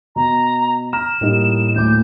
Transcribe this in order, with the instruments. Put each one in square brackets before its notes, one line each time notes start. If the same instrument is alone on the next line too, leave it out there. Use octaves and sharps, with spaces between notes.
[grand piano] B2 [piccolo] A#5
[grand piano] A#5 F6 A#6 [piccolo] E7
[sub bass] A2 [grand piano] G3 A#3 D#4
[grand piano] D2 A#2 D6 [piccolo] G6